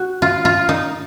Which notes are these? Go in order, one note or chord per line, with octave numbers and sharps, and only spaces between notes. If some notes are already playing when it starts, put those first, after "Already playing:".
Already playing: F#4
F4
F4
D#4